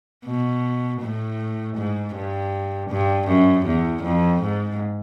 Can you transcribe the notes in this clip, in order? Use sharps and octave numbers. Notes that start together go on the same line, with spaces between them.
B2
A2
G#2
G2
G2
F#2
E2
F2
G#2